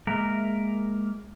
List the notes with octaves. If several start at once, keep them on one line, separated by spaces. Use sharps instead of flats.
G#3 A#3 A#4 E5